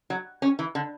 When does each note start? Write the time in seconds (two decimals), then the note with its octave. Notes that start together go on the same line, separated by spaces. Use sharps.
0.10 F#3
0.42 C#4
0.59 E3
0.75 D3